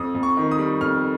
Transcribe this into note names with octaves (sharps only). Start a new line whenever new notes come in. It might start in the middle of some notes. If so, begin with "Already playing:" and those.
Already playing: F2 D#6
F2
C#6
D#3
D#6
G3
F2 F6